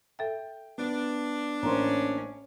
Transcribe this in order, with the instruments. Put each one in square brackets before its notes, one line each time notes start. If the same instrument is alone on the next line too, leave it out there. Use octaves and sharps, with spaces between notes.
[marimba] A4 E5 [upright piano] G5
[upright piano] B3 [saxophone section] D4
[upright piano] A1 A#3 C5 [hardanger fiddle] C#4 [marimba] A#5 C6